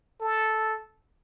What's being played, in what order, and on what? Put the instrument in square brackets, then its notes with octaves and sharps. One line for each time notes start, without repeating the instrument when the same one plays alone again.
[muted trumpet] A4